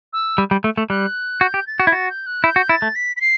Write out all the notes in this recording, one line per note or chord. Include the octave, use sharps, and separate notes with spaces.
E6
G3
G3
A3
A3
G3 F#6
F#4 G6
G4
A6
F#4
E4
F#4 A6
G6
F#6
E4 G6
F#4
E4 A6
A3
B6
B6
C7